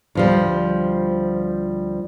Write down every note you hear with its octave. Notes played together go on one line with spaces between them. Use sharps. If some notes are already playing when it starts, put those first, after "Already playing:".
D2 F3 G3